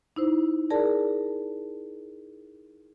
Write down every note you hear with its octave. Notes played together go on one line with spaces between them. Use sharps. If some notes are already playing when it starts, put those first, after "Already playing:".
D#4 E4 C5
G#4 A#4 D5 A5